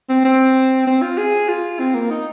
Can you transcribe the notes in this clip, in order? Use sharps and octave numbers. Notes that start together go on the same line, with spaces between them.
C4
C4
C4
F4
G#4
F4
C4
A#3
D#4